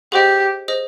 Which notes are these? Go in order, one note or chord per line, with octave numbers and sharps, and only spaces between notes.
G4 G#4 C5 D#5
G#4 C5 D#5